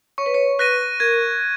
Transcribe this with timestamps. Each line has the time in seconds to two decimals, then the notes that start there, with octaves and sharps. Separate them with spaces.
0.18 C#5 C#6
0.26 B4
0.34 C#5
0.59 B4 F#6 A#6 D#7
1.00 A#4 G#6